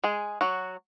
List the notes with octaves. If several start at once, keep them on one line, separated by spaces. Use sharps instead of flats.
G#3 G#4
F#3 F#4